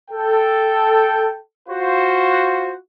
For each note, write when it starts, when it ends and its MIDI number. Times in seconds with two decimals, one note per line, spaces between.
0.11 1.37 69
0.11 1.37 79
1.69 2.74 65
1.69 2.74 66
1.69 2.74 72